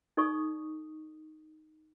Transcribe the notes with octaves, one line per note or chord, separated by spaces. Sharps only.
D#4 A4 D5 C#6 D#6